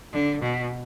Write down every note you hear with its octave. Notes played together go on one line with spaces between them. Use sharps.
D3
B2